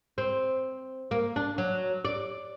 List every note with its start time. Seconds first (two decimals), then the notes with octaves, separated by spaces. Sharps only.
0.18 C4
1.11 A#3
1.36 D4
1.58 F#3
2.05 D5